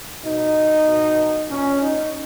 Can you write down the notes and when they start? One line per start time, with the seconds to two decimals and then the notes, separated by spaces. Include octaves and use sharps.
0.24 B2 D#4
0.87 B2
1.49 A#2 C#4
1.82 D#4